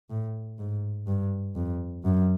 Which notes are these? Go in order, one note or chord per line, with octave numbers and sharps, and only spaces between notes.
A2
G#2
G2
F2
F#2